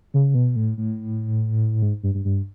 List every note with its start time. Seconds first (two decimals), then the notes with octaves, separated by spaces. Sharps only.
0.14 C#3
0.35 B2
0.56 A2
0.78 A2
1.82 G#2
2.03 G2
2.15 G2
2.25 G2